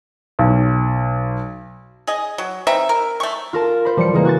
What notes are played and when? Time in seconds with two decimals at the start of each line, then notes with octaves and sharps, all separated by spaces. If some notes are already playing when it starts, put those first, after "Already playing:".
0.39 B1
2.07 G#4 D#5
2.38 F#3
2.67 C4 D#4 B4 E5
2.89 A#4
3.20 A3 C#6
3.53 F4 A#4 A5
3.85 C5 B5
3.97 E3 F3 G3 C#7
4.13 C#3 E3 G#3 A#3
4.25 F#4 C#6 A6